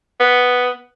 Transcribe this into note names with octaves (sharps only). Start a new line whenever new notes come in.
B3